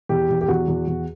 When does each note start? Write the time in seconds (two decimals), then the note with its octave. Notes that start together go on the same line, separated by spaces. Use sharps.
0.09 E2 G4
0.30 E2
0.41 G4
0.48 E2 F#4
0.68 E2
0.88 E2